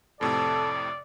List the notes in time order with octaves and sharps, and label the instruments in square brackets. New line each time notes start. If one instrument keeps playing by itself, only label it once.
[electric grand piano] F2 A2 C3 [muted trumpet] A4 [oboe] D5